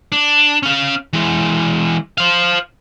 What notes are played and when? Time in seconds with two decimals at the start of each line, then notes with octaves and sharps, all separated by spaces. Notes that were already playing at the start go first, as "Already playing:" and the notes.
0.12 D4
0.63 C#4 F5
1.13 E3 G#3
2.18 C5 F5